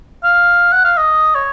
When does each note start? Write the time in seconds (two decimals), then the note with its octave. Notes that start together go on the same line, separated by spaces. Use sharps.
0.24 F5
0.72 F#5
0.85 F5
0.97 D#5
1.35 C#5